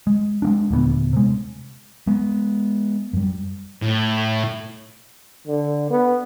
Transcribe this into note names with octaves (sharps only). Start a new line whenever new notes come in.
G#3
G#3 A#3 D4
D#1 D2 A#3 B3
C3 G#3
G#3 B3
F#2 G3
A2
D3
B3